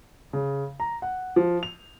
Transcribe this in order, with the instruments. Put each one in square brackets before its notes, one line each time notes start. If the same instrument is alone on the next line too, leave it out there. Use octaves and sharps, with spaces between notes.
[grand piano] C#3
A#5
F#5
F3
F7